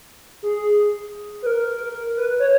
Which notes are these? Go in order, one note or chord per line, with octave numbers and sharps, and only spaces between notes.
G#4
B4
A#4
B4
C#5